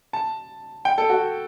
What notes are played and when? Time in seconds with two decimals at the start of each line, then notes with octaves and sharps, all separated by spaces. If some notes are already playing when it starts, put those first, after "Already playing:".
0.13 A5
0.85 G5
0.98 A4
1.10 F#4